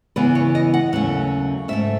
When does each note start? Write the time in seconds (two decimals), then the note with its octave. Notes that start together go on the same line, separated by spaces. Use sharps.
0.16 C#3 E3 B3 B4
0.35 C#5
0.55 D#5
0.74 F#5
0.92 D#2 C#3 F#3 A3 C#4 F#5
1.68 G#2 F#3 A3 E5